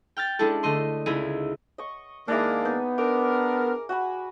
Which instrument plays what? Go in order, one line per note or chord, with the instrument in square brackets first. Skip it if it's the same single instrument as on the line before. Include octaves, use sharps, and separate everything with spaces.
[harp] G5 F6 G6 A6
G#3 C#4 D4 E4 A4
D3 A3 D#5 C6
C#2 D#4 E4 G#4
[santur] D#5 C#6
[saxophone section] D#3 G#3 A#3 [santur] D4 E4 G#4
[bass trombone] B3 [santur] D#4
[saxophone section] D4 A#4 [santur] D6
[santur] F#4 G#5 B5